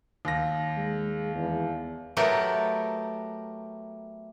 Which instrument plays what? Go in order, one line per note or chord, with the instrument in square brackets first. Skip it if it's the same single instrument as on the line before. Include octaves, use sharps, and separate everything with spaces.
[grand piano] D#2 A#6
[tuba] G#3
E2
[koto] F#3 A3 B3 G4 A4 A#4